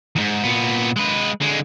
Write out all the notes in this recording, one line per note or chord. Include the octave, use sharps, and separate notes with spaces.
E2 G#2
A#2 B3
G#3 B4
D3 G#3